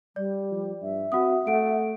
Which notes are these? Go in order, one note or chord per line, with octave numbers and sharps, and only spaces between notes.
G3 D5
F3
G2 E5
C4 F#4 F#5 D#6
A3 F#5 D7